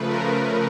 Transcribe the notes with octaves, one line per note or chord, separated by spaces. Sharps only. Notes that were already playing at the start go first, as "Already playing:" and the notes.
Already playing: C#3 F3 A3 B4
A#4